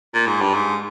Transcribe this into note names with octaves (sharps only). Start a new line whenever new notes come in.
A#2
G#2
G2
G#2